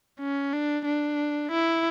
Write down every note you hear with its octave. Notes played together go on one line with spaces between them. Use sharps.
C#4
D4
D4
E4